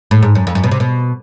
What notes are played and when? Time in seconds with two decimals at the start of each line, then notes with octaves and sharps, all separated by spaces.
0.11 A2
0.23 G#2
0.35 F#2
0.47 F2
0.55 F#2
0.64 B2
0.71 C3
0.80 B2